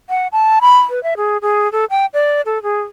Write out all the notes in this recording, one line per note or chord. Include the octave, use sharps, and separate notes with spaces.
F#5
A5
B5
B4
E5
G#4
G#4
A4
G5
D5
A4
G#4